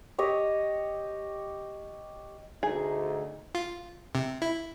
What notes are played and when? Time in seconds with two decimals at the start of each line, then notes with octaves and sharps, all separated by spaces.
0.18 G4 C#5 D#5
2.63 D2 D#4 G#4
3.55 F4
4.15 C3
4.42 E4